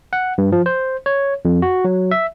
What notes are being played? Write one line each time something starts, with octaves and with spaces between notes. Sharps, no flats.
F#5
G2
F3
C5
C#5
F2
F#4
F#3
E5